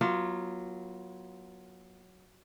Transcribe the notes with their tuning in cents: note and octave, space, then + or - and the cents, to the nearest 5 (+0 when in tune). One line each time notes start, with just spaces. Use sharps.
F#3 +0 B3 -45 F4 +0